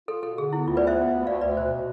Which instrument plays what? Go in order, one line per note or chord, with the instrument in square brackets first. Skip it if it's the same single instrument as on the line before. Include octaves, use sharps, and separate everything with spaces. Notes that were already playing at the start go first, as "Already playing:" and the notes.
[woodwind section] F4 [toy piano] A4
[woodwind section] B2 [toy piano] A4
[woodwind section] D3 [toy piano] G#4
[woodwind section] B3 [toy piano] E4
[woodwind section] D2 [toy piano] F4
[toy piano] B4 D5
[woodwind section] B3 [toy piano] C5 E5
[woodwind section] B3
D2
[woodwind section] D2 [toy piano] D5 F5
[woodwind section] D2 [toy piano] B4 D5
[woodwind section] B2 [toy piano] C5
[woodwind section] B2